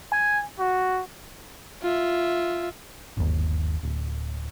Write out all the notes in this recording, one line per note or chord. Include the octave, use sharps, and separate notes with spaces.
G#5
F#4
F4 E5
G1 D#2
D1